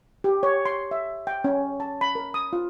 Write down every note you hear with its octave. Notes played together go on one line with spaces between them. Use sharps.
G4
C#5
C6
E5
G5
C#4
A5
B5
A#4
D#6
F4